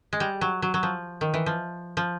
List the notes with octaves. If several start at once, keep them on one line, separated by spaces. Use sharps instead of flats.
G#3
G3
F#3
F#3
F#3
F3
D#3
E3
F3
F3